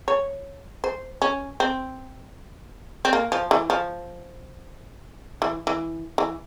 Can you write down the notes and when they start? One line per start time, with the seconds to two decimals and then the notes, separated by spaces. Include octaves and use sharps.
0.08 C#5
0.84 C5
1.22 C#4
1.60 C4
3.05 C4
3.13 A#3
3.32 F3
3.51 E3
3.70 F3
5.42 E3
5.67 E3
6.18 E3